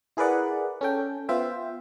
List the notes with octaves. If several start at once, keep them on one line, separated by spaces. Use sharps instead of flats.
E4 G#4 A#4 B4 D5 F#5
C#4 A4 G5
B3 F4 C5 E5 G5